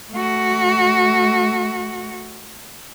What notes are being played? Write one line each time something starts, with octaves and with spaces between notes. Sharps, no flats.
A3 F#4